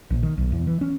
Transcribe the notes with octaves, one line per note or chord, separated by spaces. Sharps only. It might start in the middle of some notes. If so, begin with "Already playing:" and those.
A#1
D#3
B1
E2
E3
C#4